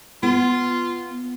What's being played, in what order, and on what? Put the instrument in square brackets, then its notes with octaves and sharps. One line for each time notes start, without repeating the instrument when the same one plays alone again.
[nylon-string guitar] B3 [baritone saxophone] F4